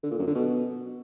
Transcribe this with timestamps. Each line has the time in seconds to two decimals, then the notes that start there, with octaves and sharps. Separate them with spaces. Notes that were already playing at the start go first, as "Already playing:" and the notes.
0.03 D3
0.11 A#2
0.19 F#2
0.27 D3
0.35 B2